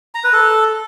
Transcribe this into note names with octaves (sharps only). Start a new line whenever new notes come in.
A#5
B4
A4